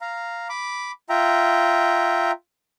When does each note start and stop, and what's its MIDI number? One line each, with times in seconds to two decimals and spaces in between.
0.01 0.48 77
0.01 0.48 82
0.49 0.92 83
0.49 0.92 86
1.09 2.31 65
1.09 2.31 76
1.09 2.31 79
1.09 2.31 82